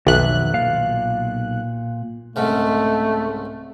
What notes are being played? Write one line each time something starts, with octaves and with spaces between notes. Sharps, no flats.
B1 F2 D#3 E5 F#6
A#2 F5
C2 G#2 C#3 A3